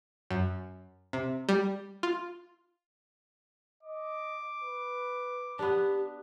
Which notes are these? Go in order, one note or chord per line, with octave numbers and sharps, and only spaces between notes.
F#2
C3
G3
F4
D#5 D6
B4
B3 D4 G4